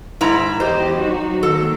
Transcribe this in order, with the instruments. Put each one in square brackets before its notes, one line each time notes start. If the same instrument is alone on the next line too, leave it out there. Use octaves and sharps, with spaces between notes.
[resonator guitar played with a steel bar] G#2 E4 A#5 [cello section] D#3
[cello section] E2 G4 D#5 [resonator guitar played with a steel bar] C5
[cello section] F#3 D#4 F#4
[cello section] D#3 A#3 [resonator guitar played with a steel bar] A4